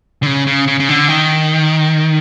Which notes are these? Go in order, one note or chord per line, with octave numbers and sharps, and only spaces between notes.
D3
C#3
C#3
C#3
C#3
D3
D#3